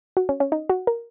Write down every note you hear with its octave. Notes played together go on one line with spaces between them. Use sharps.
F#4
C#4
C#4
D#4
F#4
A#4